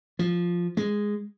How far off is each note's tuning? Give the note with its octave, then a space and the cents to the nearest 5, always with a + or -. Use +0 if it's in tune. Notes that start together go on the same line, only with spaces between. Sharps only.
F3 +0
G#3 -5